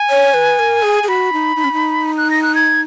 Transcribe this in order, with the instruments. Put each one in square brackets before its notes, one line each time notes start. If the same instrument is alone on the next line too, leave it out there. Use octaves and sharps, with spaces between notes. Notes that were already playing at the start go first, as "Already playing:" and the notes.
Already playing: [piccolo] G#5
[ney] C#5
B4
A#4
G#4
G#4
[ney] F#4 [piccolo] B5
[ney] D#4
D#4
C#4
D#4
[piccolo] F#6
A#6
F#6
G#6